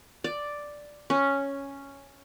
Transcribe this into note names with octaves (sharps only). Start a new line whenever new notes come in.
D5
C#4